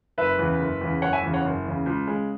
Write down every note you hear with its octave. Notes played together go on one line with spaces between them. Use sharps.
F#1 B4 E5
E2 C#3
F#1
E2 C#3
F#1 C#5 F#5
E5 G#5
E2 C#3
C#5 F#5
F#1
E2 C#3
C#2
C#3 G#3